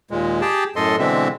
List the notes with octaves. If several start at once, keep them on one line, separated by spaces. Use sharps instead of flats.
D#2 A#2 G#3
G4 G#4 G5 A5
F#2 A2 A4 D#5 C6
B2 D3 E3 G#3 C4 E5